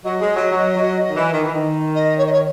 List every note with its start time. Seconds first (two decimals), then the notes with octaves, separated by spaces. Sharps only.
0.04 F#3 D#5
0.21 G#3
0.35 F#3
0.51 F#3
0.76 F#3
0.99 F#3
1.08 D#3
1.16 E3
1.32 D#3
1.43 E3
1.54 D#3
1.95 D#5
2.18 C#5
2.26 D#5
2.33 C#5